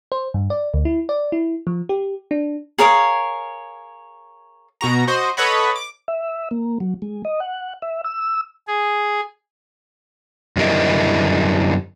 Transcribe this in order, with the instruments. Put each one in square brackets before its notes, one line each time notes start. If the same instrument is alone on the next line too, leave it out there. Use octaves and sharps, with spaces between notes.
[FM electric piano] C5
G2
D5
D2
E4
D5
E4
F3
G4
D4
[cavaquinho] G#4 A#4 C#5 F5
[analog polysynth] B2 F#4 A#5
F#4 C5 D#5
A4 B4 C#5 D#5 F#5 B5
D6
[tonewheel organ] E5
A#3
F#3
G#3
D#5
F#5
E5
E6
[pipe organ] G#4
[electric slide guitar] F#2 D3 G3 E4 A#4 D#5